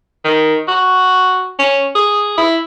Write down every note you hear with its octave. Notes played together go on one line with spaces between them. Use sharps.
D#3
F#4
C#4
G#4
E4